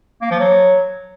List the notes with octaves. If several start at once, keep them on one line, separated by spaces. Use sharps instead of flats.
A#3
F3
F#3